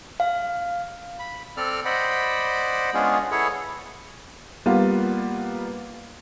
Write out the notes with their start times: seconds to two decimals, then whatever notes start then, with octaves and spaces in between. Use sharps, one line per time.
0.20 F5
1.19 B5
1.57 C4 A4 D5 F6
1.85 C5 D5 D#5 F#5 B5
2.94 G#3 B3 C#4 D4 F4 G#4
3.31 E4 G#4 A4 B4 C#5 F#5
4.66 G3 A#3 B3 F4